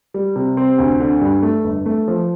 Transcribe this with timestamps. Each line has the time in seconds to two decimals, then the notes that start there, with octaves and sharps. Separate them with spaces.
0.14 G3
0.36 C3
0.57 C4
0.78 D2
1.00 D3
1.21 G2
1.42 A3
1.64 G1
1.86 A3
2.08 F3